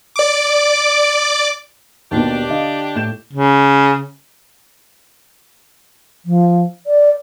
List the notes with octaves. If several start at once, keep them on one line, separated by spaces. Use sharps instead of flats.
D5 D6
D#2 B2 D4 G4
D3 D#5 F5
A2 G6 E7
C#3
F3
D5